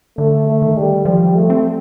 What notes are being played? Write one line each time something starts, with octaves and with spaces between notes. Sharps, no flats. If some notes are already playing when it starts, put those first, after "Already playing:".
D3 A3
A3
D#3
G3
F3 G3
A3
C4